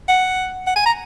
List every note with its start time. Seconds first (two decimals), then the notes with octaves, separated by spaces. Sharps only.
0.09 F#5
0.67 F#5
0.76 G#5
0.86 A#5